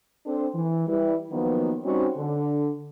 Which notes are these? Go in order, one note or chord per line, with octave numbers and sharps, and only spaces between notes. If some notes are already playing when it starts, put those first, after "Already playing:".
C4 D4 A4 C5
E3
G3 E4 B4
D#3 F3 F#3 A#3 B3
G3 C4 C#4 D#4 F#4
D3